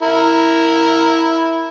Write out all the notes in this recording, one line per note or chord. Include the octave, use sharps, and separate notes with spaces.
E4 A#4